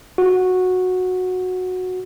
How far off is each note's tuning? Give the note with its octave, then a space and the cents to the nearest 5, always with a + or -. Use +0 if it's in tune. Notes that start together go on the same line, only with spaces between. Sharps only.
F#4 -10